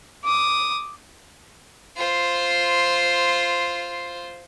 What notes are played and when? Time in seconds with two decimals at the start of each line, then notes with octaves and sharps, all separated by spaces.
0.24 D6 D#6
1.97 F4 C5